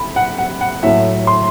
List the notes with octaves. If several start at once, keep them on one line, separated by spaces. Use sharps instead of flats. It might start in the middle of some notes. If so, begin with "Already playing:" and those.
Already playing: C2 B5
F#5
F#5
F#5
A2 F#3 A3 E5
C6